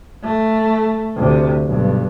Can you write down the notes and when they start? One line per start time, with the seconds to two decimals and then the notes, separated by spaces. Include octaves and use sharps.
0.23 A3
1.17 D2 C3
1.66 B1 G2